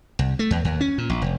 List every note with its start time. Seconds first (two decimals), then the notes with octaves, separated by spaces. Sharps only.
0.19 C2
0.39 A3
0.51 E2
0.65 D#2
0.81 C#4
0.98 A#2
1.09 A#1
1.22 F1